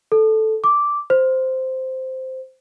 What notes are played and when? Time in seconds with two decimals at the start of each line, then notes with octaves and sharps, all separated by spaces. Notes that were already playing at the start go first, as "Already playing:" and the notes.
0.12 A4
0.64 D6
1.10 C5